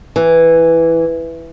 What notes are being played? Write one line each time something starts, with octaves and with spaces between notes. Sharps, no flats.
E3